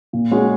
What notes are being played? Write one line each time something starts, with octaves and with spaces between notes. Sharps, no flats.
A#2
G#3 C#4 F#4